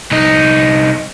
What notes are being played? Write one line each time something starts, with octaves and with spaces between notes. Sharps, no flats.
C2 D#4